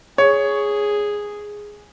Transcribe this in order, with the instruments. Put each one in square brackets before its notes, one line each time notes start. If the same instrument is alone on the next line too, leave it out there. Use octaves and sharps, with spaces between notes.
[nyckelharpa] G#4 [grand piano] C#5